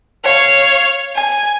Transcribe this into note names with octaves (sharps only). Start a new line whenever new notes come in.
C#5 F5
G#5